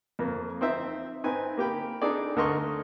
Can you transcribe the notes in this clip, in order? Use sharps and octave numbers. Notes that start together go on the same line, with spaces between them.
F2 A#3
C4 D#4 C5 E5
C4 D#4 B4 G#5
A#3 G4 G5 B5
D4 D#4 G#4 A4 D5
D2 A4 A#4 D#5 C6 C#6